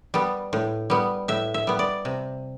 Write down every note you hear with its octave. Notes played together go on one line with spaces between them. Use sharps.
G3 B3
A2
G3 B3
A2 E5
E5
G3 B3
D5
C3